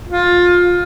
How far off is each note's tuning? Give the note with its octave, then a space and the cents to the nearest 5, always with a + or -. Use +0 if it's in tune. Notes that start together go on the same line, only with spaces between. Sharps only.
F4 +20